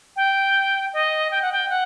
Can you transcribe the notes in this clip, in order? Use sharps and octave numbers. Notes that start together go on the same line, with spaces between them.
G5
D#5
G5
F#5
G5
F#5